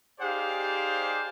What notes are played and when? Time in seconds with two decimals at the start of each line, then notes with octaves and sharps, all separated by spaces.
0.20 D#4 G4 G#4 C5 D5 F5